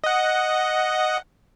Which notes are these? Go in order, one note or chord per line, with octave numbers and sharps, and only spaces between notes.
D#5 F#5